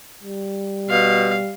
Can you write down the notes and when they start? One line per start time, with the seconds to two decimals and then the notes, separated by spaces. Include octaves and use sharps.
0.23 G3
0.90 B2 F5